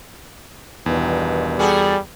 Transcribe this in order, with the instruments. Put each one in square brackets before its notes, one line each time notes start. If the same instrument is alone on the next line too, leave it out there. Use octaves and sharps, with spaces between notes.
[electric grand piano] E2 [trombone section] G2 B2 D#3
[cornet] G3 [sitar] F#4 G#4 A4